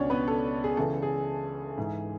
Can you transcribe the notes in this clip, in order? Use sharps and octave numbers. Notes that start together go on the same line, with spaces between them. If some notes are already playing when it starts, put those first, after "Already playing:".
Already playing: C#2 B2 C#4 D4 C#5 D5
B3 B4
A4
G#4
C#2 C#3 E3 A4
G#4
G#2 E3